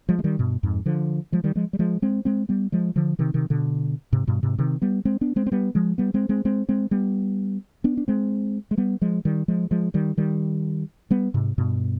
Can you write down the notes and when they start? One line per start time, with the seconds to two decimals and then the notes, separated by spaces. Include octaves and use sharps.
0.09 F3 G#3
0.19 G#3
0.24 D#3 G3
0.39 G2 B2
0.63 F2 G#2
0.86 D3 F3
1.32 F3 G#3
1.44 D#3 G3
1.55 F3 G#3
1.73 G3
1.79 F3 G#3
2.02 G#3 C4
2.25 G#3 C4
2.49 G3 B3
2.72 F3 G#3
2.96 D3 F3
3.19 C3 D#3
3.34 C3 D#3
3.50 B2 D3
4.12 G#2 C3
4.27 G2 B2
4.43 G#2 C3
4.58 C3 D#3
4.82 G3 B3
5.05 G#3 C4
5.21 B3 D4
5.36 G#3 C4
5.47 C4
5.52 G3 B3
5.75 F3 G#3
5.98 G3 B3
6.14 G#3 C4
6.29 G#3 C4
6.45 G#3 C4
6.69 G#3 C4
6.91 G3 B3
7.84 B3 D4
7.97 D4
8.08 G#3 C4
8.71 G#3
8.77 G3 B3
9.01 F3 G#3
9.25 D#3 G3
9.48 F3 G#3
9.71 F3 G#3
9.94 D#3 G3
10.17 D#3 G3
11.11 G3 B3
11.34 G#2 C3
11.58 G2 B2